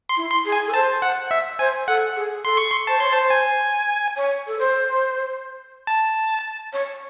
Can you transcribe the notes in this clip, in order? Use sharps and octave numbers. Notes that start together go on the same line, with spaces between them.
C6
E4
C6
G#4
G#5
A4
C5 A5
F#5
E5
C5 G#5
A4 F#5
G#4
A4 C6
C#6
C6
C5 A5
C#5 C6
C5 A5
G#5
C#5
A4
C5
A5
C#5